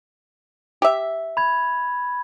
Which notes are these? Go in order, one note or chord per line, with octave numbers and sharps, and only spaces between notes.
G4 E5
B5 G#6